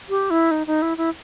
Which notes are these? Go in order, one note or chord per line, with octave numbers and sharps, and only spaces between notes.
G4
E4
D#4
D#4
E4
E4